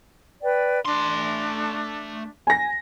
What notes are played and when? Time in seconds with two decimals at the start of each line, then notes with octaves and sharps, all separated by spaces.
0.42 B4 D5 G5
0.86 A3 D4 C6
2.47 G#5 A#6